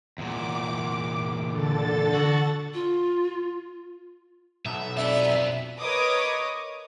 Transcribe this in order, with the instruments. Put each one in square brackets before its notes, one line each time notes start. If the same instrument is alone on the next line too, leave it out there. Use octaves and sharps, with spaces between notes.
[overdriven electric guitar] E2 A#2 [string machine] D6
[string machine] D3 A4 A6
[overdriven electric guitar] F#4
[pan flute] F4
[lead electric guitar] B1 [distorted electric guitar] E5
[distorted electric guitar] F2 B3 [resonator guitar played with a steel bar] D4 [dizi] E5
[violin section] A#4 B4 C#5 D#5 D6 D#6